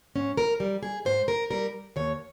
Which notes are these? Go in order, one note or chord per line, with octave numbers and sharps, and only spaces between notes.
G#2 C#4
A#4
G3
G#4
G#2 C5
A#4
G3 A#4
D#2 C#5